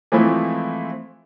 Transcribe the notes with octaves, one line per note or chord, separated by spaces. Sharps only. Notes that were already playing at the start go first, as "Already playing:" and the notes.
E3 F3 G#3 A3 C4 E4